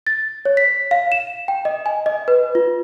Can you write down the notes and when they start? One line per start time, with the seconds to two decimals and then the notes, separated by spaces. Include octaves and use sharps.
0.07 A6
0.45 C#5
0.57 B6
0.91 F5
1.12 E7
1.48 G5
1.65 D#5
1.86 G#5
2.06 D#5
2.28 B4
2.55 F4